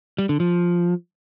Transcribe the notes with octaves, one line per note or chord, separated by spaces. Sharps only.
G3
D3
F3